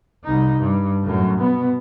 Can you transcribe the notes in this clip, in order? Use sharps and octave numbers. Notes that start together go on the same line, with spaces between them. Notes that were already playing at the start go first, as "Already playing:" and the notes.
C2 D#4
G2
F#2 A2
B2 B3